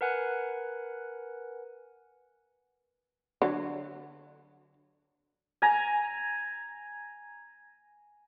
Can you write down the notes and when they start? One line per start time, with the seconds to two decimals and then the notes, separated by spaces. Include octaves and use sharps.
0.01 A#4 B4 F#5 G#5 F#6
3.42 D3 F#3
5.62 G#5 A#5